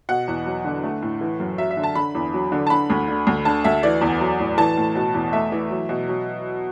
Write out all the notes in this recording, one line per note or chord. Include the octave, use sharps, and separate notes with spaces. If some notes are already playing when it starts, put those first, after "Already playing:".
B2 F#5
E2
F#3
D3
A3
A2
E3
F#2
F#3 E5
E5
D3
A5
D3 B5
E2
F#3
D3
A5
D3 B5
D2
D3
D2
D3 A5
D2 E5
E3 D5
E2
F#3
A2
E3 A5
A2
B2
E2
A3 E5
E3
F#3
B2
F#3